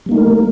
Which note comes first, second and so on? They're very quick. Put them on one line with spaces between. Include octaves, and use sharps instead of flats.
G3 A#3 D#4 A3 A#4